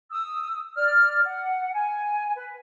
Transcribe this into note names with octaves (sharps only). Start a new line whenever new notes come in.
D#6 E6
D5 F6
F#5
G#5
B4